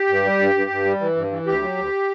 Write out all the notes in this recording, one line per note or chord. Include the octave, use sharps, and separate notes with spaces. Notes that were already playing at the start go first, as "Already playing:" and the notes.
Already playing: G4
G2
G3
G2
G2
G2
G3
E3
G2
E3
D2 G4
F#3
D2